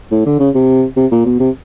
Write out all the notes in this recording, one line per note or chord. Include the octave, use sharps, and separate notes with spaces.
A2
D3
C#3
C3
C3
A#2
B2
C3